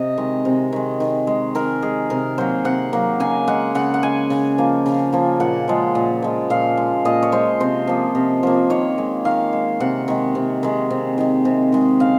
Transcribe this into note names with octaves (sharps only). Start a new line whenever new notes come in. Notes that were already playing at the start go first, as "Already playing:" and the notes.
Already playing: C3 D#5
D#3 G#3
C3
D#3 G#3
D#3
G#3
D#3 A#4
G#3 G#4
C3 A#4
F#3 A#3 C5
C3 F#5
F#3 A#3
C#3 G#5
G#3 F#5
C#3 F#5
F#5
G#3 G#5
C#3
F3 A#3
C#3
F3 A#3
A#2 F#5
F3 G#3
A#2
F3 G#3
A#2 F5
G#3
A#2 D#5
C#5
G#3 C5
C3 C5
F3 A#3
C3
F3 A#3
D#3 C#5
G#3
D#3 F5
G#3
C3 F#5
D#3 G#3
C3
D#3 G#3
C3
D#3 G#3
C3
D#3 G#3
C#3 F5